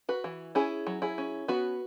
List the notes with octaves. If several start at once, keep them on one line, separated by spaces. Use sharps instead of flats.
F#4 B4
E3
C#4 E4 G#4
F#3
E4 G#4
C#4
B3 F#4 B4